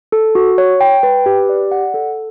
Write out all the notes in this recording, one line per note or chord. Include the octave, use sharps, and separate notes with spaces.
A4
F#4
C#5
G5
B4
G4
D5
F#5
A4